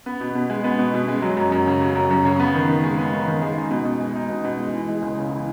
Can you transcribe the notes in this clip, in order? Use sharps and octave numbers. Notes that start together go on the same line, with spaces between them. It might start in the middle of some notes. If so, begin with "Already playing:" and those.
B3
B2
B2
G#3
B3
B2
B2
G#3
F#3
F#2
F#2
C#3
F#3
F#2
F#2
C#3
B3
D#3
D#3
G#3
B3
D#3
D#3
G#3
D#4
B2
B2
G#3
D#4
B2
B2
G#3
E3
G#3
C#2
C#3
E3